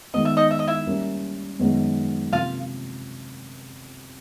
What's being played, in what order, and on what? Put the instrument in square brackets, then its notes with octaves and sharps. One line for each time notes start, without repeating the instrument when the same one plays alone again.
[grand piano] D#3 G#3 B3 [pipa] D#5
[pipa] E5
D#4 D#5
E5
D#5
E4 E5
[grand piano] G3 A#3 C#4
F#2 D#3 G#3 B3
[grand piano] C3 F3 A#3 [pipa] F4 F5